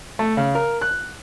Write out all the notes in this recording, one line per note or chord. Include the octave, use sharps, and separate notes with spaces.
A3
C#3
A#4
F#6